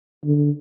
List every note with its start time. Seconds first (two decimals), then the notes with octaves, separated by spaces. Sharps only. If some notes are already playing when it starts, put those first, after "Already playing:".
0.25 D3